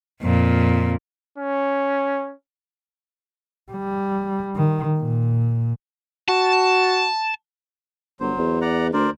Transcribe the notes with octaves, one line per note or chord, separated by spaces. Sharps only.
F2 A#2
C#4
G3
D#3
A#2
F#4 A5
G1 F#3 C5
E2
D5 F#5 A#5
D2 A#4 C5 D5